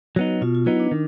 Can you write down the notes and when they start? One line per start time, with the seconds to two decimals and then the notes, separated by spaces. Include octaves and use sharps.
0.16 F#3 B3 D#4 F#4
0.41 B2 F4
0.55 F4
0.66 F#3 B3 D#4 E4
0.80 D4
0.91 D#3